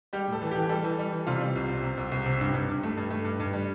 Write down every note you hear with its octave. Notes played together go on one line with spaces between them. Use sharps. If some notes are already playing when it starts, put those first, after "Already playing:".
G3 G4
A2 A4
E3
A4
G4
E3
G4
G3 A4
E3
G3
E3
C3 F4
G3
C2
C3
C3
C2
C2
C3
G2
G2
G2
A3
G2
A3
G2
G2
G3